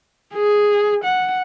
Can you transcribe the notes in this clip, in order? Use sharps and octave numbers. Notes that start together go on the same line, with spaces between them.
G#4
F#5